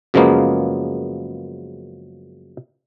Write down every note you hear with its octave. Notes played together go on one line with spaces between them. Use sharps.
F#2 C#3 F3 G#3 A#3 B3